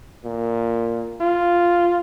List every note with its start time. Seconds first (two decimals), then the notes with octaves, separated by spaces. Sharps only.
0.25 A#2
1.21 F4